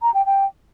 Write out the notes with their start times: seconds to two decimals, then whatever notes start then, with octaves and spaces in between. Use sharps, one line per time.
0.02 A#5
0.14 G5
0.26 G5